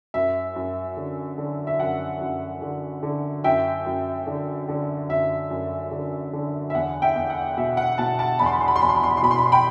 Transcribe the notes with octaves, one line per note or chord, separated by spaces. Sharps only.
F#2 E5
F#2
D3
D3
E5
F#2 F#5
F#2
D3
D3
F#2 E5 G5
F#2
D3
D3
F#2 E5
F#2
D3
D3
E5
E2 F#5
E5 G5
E2
F#5
B2 E5
F#5
B2 F#5 A5
F#5 A5
E2 B5
C6
B5
C6
B5
C6
E2 B5
C6
B5
C6
B5
C6
B2 B5
C6
B5
C6
G5 B5